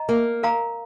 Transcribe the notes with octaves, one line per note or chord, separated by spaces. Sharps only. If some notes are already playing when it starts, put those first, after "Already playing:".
Already playing: D#5 A#5
A#3
A#4 F5 A#5